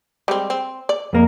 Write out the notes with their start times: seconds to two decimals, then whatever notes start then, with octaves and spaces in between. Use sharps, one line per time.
0.28 G3 G#3 C4
0.50 C4
0.89 D5
1.13 F2 A#3 A#4